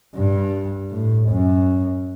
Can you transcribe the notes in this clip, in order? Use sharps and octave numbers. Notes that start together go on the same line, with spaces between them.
G2
A2
F#2